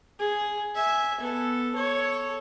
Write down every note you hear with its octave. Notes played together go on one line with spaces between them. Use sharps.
G#4
E5 G#5
B3 A4
A4 C#5